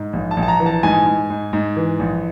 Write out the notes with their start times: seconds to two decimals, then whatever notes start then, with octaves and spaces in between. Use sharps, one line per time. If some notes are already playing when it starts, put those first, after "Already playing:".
Already playing: G#2
0.13 A#1
0.31 A5
0.37 A#1
0.43 A5
0.48 A#5
0.60 E3
0.66 A5
0.83 G#2 G#5
1.06 G#2
1.30 G#2
1.53 G#2
1.76 E3
1.99 A#1